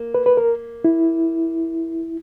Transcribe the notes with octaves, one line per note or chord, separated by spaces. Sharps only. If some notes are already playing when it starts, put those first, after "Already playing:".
Already playing: A#3
B4
B4
A#4
E4